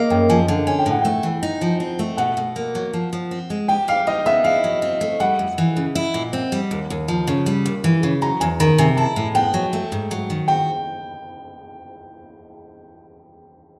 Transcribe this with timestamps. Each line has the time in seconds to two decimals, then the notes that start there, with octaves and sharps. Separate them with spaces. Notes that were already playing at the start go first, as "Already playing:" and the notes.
Already playing: A#3 D#5 F5
0.10 F#2 G5
0.29 F3 G#5
0.48 D3
0.67 C#4 G#5
0.79 G5
0.86 A2 F#5
1.02 A3 G5
1.23 E3
1.43 D#4
1.61 F3
1.80 C4
1.99 A3
2.17 B2 F#5
2.37 B2
2.56 A#3
2.75 F#3
2.93 F3
3.13 F3
3.31 C4
3.50 G#3
3.68 G4 G5
3.88 G3 F5
4.07 D#4 D#5
4.26 B3 E5
4.44 E4 F5
4.64 F#3
4.82 C4
5.01 A3
5.20 G3 F#5
5.39 F2
5.58 E3
5.76 C#3
5.95 E4
6.14 A#2
6.33 C4
6.52 G3
6.71 D#2
6.90 D#2
7.08 F3
7.27 C#3
7.46 G3
7.66 D#2
7.84 E3
8.03 C#3
8.22 F#3 A#5
8.40 E2 G#5
8.60 D#3 A#5
8.78 C3 G#5
8.97 E4 A5
9.16 A2
9.35 B3 G5
9.54 F#3
9.73 A3
9.92 G#2
10.11 F#3
10.30 D#3
10.48 F#4 G5